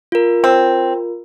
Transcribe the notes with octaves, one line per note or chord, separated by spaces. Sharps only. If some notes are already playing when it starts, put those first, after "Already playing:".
F4 A#4
C4